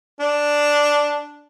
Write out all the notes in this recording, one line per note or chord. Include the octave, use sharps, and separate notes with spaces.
D4